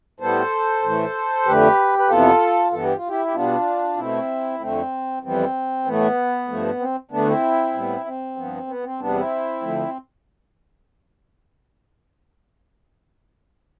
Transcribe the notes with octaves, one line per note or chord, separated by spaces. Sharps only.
A2 G3 B3 A4 C5
A2 E3 A3
F2 D3 A3 G4 B4
B4
F2 C3 E3 B3 F4 A4
G2 E3 B3 A4
G4
F4
E4 G4
G4
B2 G3 B3 D4 F4
B2 A3 C4 E4
F2 D3 A3 C4
F2 E3 G3 B3 C4
A2 E3 A3 B3
G2 F3 A3
C4
D2 D3 A3 B3 D4
C4 E4
A2 G3 B3
C4
G2 F3 B3
B3
C4
E2 C3 G3 B3 D4
C4 E4
D2 D3 F3 A3